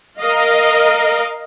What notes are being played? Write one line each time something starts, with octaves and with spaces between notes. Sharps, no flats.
A#4 D#5 F5